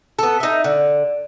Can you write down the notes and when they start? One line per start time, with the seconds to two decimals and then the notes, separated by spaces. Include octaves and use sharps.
0.19 B3 A4
0.40 D#4 E5
0.64 D3